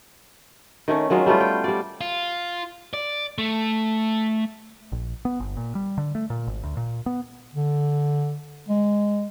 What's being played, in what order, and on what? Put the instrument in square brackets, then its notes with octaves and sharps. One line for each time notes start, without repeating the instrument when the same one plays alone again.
[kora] D#3 A3 C#4
D#3 F#3 G#3 F4
G3 A3 B3 F4
G5
G3 D5
[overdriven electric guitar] F4
D5
A3
[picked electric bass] A#1
B3
G1
A#2
G3
D3
A3
A#2
G#1
D2
A#2
B3
[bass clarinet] D3
G#3